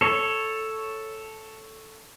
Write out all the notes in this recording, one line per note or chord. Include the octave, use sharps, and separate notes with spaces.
A4 C#5